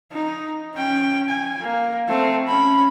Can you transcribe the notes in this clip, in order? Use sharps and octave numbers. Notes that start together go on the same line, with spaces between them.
D#4
C#4 G5
G#5
A#3
A3 C4
C#4 B5